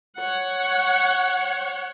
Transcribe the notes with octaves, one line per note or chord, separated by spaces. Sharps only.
C#5 F#5